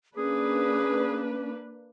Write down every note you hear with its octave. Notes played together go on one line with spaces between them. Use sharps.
A#3 C#4 D4 G#4 B4